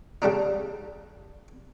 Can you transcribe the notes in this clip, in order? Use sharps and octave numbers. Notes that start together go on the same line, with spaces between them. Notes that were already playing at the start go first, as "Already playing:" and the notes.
C#3 G3 D4 D#4